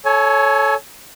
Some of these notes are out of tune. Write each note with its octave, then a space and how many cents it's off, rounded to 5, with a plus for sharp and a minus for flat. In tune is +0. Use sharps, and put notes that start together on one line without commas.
A4 -10 C#5 +0 G#5 +30